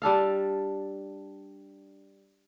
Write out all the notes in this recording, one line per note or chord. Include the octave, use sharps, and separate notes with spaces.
G3 D4 A4 F5